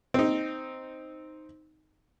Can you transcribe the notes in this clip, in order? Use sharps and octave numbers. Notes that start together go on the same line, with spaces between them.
C4 D#4